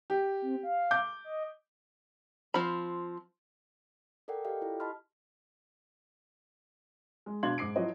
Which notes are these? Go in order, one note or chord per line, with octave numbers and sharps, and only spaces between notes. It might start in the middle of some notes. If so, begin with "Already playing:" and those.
G4
C4
F5
D6 G6
D#5
F3 C4 B5
A4 A#4 D5 F#5 G5
G4 A4 D5 D#5 F5 G5
E4 F4 G4
D#5 A5 B5 C6 F6
G#3
B2 D4 F5 C6 G#6 F#7
G#2 D6 C7 D7
F3 F#3 E4 F#4 C5 D#5